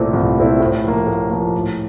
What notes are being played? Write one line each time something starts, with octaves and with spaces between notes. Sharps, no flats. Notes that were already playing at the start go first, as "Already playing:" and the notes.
Already playing: C2 A#2 A3 C4 E4
C2
A#2 A3 C4 E4
A2
F3 A#3
A2
F3 A#3
A2